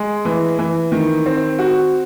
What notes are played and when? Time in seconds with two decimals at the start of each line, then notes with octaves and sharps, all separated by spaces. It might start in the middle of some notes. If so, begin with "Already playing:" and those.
Already playing: G#3
0.25 E3
0.59 E3
0.92 D#3
1.26 C4
1.59 F#4